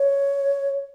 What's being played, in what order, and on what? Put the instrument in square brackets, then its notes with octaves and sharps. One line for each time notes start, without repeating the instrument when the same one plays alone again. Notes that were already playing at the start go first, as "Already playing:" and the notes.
Already playing: [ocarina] C#5